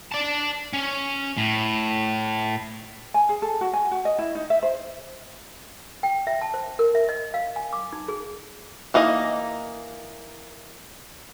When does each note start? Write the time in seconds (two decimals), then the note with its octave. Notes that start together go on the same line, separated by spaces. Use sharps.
0.12 D5 A5
0.73 C#4
1.37 A2
3.14 G#5
3.29 G#4
3.42 A4
3.61 F#4
3.73 G#5
3.91 F#4
4.05 D#5
4.19 E4
4.35 D#4
4.50 E5
4.63 C5
6.03 G5
6.27 E5
6.42 A5
6.54 C5
6.79 A#4
6.95 E5
7.09 D#5
7.34 F5
7.56 G#5
7.73 D6
7.93 D#4
8.08 G#4
8.94 E3 A#3 D#4 D#5